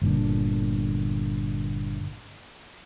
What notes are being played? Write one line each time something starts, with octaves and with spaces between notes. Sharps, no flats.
G1 A#2 D3